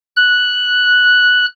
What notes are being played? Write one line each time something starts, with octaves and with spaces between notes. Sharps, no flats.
F#6